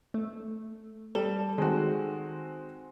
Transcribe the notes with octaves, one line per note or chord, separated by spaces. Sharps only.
A3
G3 A4
D#3 G#3 C4 F#4